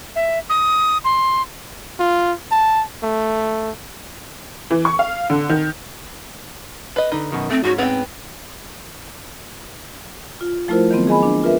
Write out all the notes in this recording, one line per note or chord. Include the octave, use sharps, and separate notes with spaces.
E5
D#6
C6
F4
A5
A3
E3
C#6
F5
D3
D#3
B4 D#5
D3 D#4 B4
F#2 B2 D#3
A3 C4
G#2 C#4 F#4
B3 C4 G5
F4
F3 A3 E4 F4 A#4 C5
D#3 F#3 B3 C4
G#4 D#5 G#5 B5
D4
F4 A#4 B4 E5